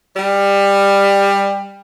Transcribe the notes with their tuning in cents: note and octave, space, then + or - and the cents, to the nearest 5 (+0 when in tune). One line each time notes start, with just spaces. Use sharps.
G3 +20